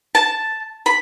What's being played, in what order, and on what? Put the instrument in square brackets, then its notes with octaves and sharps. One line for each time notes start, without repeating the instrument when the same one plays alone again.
[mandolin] A5
B5